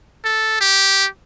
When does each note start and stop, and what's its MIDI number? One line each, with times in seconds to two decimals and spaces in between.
0.25 0.59 69
0.61 1.07 67